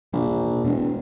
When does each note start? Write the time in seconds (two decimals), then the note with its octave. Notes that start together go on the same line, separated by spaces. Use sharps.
0.13 A#1 B2 E3 G3
0.64 E1 B2 A3